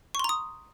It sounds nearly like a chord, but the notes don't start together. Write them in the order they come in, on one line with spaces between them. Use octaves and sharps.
C#6 C6 A#5 D#6